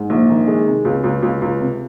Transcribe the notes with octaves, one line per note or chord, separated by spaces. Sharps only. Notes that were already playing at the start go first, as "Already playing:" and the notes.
Already playing: G#2
A#1
D#3
G#3
C3
C#2
C#2
C#2
C#2
C3